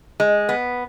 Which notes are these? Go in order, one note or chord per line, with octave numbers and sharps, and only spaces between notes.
G#3
B3